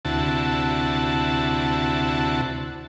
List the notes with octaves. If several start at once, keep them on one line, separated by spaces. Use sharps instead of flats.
D2 C3 E4 F#4 A5